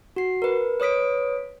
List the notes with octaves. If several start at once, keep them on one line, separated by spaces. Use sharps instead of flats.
F#4 C7
A#4 B4
B4 C#5 D#6 B6 D7